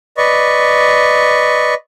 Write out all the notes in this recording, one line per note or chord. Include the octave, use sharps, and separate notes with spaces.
B4 D5 D#5 C#6